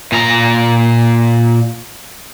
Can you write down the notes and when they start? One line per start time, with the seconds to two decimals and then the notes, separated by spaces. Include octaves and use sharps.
0.12 A#2 A#5